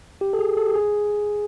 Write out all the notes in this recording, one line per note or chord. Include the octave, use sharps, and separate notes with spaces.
G4
A4
G#4
A4
G4
G#4